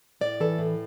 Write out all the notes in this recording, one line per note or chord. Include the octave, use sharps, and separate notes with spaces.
A2 D5
E3 A4
A2